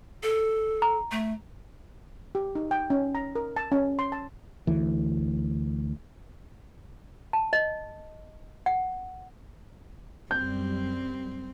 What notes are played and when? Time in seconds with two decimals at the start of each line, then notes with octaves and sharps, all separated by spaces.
0.23 A4
0.82 A#5
1.11 A3
2.35 G4
2.55 D#4
2.71 G5
2.90 C#4
3.15 A#5
3.35 A#4
3.56 A5
3.72 C#4
3.99 C6
4.12 A5
4.67 D2 E3
7.33 A5
7.53 D#5
8.66 F#5
10.31 F#2 G3 C4 G6